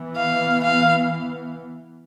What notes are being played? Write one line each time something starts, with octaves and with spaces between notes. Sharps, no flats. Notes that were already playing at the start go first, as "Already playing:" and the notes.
Already playing: E3 B3
F5
F5